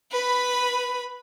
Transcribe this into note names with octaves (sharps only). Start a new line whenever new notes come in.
B4 B5